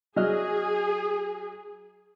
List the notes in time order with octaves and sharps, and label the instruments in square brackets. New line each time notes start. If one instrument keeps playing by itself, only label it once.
[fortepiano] F#3 D#5 F6 [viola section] G#4